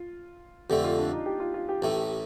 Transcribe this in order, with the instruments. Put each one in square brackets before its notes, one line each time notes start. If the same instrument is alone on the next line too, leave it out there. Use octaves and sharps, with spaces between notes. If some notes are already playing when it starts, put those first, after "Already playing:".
Already playing: [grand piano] F4
[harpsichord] F2 D3 A3 [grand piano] G4
[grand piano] F4
D4
D#4
G4
F4
F4
G4
[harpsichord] A1 A2 A3